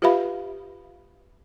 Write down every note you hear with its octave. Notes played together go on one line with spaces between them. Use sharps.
F4 G4 B4 E5 F5 B5